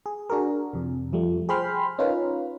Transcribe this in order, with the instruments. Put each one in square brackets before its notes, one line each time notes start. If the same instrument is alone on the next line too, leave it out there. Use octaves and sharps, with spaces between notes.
[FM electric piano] G#4
D4 F#4 G#4 A#4
F2 C3
F2 F3 G3 A3
G#4 C5 G5 B5 C6 F6
C#4 D#4 F4 A#4 B4